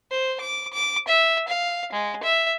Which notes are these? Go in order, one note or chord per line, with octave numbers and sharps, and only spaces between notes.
C5
D6
D6
E5
F5
G#3
E5